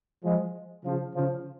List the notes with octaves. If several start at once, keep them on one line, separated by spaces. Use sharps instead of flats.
F3 G#3
C#3 F3
C#3 F3